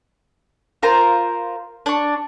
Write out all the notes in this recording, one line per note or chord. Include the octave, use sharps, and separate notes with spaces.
F4 A#4 C5 A#5
D4 C#6